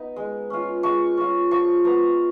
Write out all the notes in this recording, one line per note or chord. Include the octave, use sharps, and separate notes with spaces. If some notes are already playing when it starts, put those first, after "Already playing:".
Already playing: B3 D#4
G#3
C#4 F4
G#3 C#6
C#4 F4
F3 C#6
B3 F4 A#5